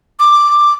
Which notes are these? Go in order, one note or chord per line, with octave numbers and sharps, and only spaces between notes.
D6